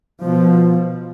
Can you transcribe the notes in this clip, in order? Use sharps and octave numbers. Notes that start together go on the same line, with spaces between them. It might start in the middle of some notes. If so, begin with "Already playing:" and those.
B2 F3